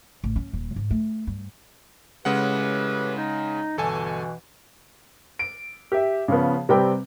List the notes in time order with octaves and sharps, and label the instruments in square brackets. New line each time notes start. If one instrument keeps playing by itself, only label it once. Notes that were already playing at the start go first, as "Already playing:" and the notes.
[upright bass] A1
C#4
D#1
G#2
A3
G2
[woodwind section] A2 G4 B4 [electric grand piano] C#3 G#3 F#5
[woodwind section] D#4
[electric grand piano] G1 A4 G#5 [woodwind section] B2 E3
[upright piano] D7
G4 E5
C#3 F3 B3
C3 G3 C4 B4 G5